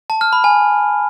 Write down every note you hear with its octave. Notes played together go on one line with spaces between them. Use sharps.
A5
F6
B5
G#5